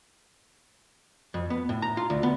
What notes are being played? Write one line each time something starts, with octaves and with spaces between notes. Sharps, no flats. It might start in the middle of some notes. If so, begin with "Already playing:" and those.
F2
B3
A2
A#5
F4
D2
B3